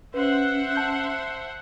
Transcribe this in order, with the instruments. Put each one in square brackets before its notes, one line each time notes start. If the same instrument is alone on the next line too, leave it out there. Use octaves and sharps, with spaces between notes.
[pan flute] C#4 [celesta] B4 [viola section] C5 E5 F#5
[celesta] A5 G6